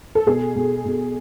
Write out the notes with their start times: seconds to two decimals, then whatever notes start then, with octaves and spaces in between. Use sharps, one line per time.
0.15 A4
0.26 B2 G#4
0.56 B2
0.85 B2